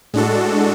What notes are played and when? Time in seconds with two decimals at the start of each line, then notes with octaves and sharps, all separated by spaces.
0.14 A2 G#3 D4 F#4 A4